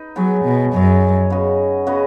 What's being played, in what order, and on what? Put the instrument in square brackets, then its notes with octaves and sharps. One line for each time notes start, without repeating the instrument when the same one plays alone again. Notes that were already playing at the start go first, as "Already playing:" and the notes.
Already playing: [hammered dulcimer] D#4 B4
[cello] F#3 [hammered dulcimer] B3 G#4 C#5
[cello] B2
[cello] F#2 [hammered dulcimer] B3 G#4 C#5
[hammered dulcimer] C#3 B3 F#4 D#5
C#3 B3 F#4 D#5